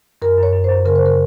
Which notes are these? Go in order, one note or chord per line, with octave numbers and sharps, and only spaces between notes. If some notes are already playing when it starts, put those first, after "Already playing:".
F#2 A#4
F#2 C#5
F#2
C5
F#2
C#3 A#4
C5
A#4